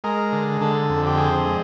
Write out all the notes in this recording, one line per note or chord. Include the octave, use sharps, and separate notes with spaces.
G#3 A#4
D3
D3 A4
F2
G4
C4 G#4
G#3